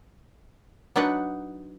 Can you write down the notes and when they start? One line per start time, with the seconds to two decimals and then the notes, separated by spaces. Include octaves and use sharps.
0.96 F#3 D4 D#4 B4 D#5 F#5